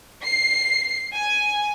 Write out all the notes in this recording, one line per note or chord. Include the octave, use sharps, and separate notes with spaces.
C7
G#5